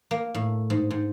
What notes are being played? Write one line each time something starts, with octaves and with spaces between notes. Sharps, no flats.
A#3
A2
G#2
G#2